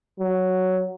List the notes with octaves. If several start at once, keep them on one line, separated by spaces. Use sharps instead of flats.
F#3